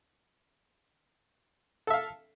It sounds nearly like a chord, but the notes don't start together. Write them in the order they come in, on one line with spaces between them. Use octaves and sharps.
A4 E5 F5